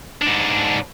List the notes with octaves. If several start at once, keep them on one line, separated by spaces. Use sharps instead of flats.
G#2 D4